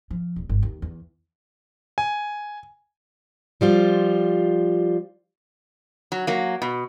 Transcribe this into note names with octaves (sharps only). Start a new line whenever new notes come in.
F3
D#1
G1
D#2
E2
G#5
F3 G3 F4
F#3
F#3 A#3
B2